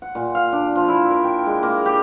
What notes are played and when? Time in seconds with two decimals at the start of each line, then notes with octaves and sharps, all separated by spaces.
0.02 F#5
0.15 A#2
0.35 F5
0.52 D4
0.75 F3
0.88 E4
1.10 A#4
1.24 G5
1.46 G#3
1.63 A#3
1.86 G4